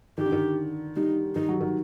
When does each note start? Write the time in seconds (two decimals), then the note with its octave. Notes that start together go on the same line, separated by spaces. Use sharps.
0.18 D#3 G4
0.26 D3
0.32 D#3
0.96 G3 D#4
1.35 D#3 D#4
1.49 F#3
1.61 D#3